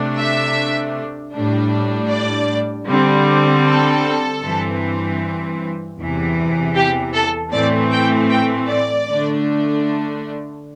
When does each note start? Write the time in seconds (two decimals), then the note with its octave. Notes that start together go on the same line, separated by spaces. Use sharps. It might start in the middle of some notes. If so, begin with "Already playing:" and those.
Already playing: C3 A3 D4
0.17 E5
1.33 A2 G3 D4
2.10 D5
2.88 D3 G3 C4
3.66 A4
4.43 G2 E3 C4
5.98 E2 C3 E3
6.75 G4
7.13 A4
7.52 A2 E3 A3 C4 D5
7.91 G5
8.30 G5
8.68 D5
9.07 D3 A3 D4